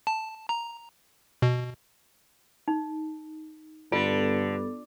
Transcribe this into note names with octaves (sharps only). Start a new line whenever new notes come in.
A5
A#5
B2
D#4
G2 D3 B3 F4 A4